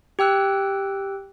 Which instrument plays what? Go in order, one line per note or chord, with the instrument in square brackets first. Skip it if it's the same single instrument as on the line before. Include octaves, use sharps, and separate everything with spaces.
[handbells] G4 G5 E6 F#6